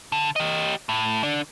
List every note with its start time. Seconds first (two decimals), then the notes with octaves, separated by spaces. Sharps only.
0.12 D3
0.36 G4 D#5
0.89 A2
1.23 D3 D4